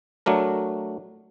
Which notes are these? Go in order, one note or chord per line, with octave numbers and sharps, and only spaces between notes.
F#3 A3 D4 A#4